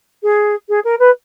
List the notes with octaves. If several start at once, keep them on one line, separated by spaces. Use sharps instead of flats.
G#4
G#4
A#4
B4